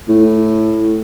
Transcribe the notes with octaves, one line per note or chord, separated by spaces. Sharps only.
A2